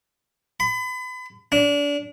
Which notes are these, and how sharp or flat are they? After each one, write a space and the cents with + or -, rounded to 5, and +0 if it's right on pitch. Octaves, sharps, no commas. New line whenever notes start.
B5 +35
D4 -30